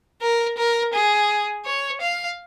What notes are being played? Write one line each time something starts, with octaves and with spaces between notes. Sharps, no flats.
A#4
A#4
G#4
C#5
F5